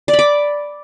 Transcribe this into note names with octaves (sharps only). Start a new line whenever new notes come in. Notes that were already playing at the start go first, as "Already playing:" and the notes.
D5
B5
D6